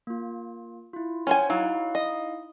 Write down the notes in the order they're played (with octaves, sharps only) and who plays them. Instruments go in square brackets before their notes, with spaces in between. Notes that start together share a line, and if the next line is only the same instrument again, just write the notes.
[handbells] A#3 F4
E4 F4
[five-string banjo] C#4 C5 G#5 [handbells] C#5 F#5
[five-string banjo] F#3 [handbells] D#4 E4 F5
[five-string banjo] D#5